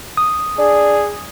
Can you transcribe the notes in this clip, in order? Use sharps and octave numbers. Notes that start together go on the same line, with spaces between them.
D#6
D4 G#4